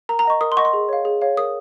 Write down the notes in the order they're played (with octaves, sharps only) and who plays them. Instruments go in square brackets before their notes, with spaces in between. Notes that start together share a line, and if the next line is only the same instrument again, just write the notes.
[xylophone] A#4 A#5
A#5
D#5 F#5 C#6
A#4 D#6
C6
D#5 F#5 C#6
C6
G#4
C#5 F5
G#4
C#5 F5
A#4 D#6